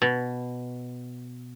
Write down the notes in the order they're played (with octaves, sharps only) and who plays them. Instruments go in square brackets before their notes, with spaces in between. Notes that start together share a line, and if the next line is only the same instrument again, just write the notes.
[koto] B2